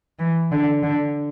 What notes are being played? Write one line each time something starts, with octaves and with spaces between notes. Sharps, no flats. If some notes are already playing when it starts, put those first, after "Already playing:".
E3
D3
D3